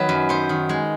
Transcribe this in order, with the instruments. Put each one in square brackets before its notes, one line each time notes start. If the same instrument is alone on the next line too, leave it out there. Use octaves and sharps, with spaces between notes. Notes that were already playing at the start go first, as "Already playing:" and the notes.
Already playing: [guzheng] D#3 F#3 B3 B4
F#2
B3 C5
D#3
G#3